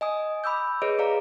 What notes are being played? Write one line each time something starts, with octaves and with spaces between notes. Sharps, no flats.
D#5 G#5 D#6
B5 D6 E6 G6
G#4 B4 C#5 D#5 D7
G#4 D5 F5 A#5